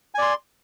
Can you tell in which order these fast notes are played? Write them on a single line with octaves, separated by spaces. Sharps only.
G#5 D5 C6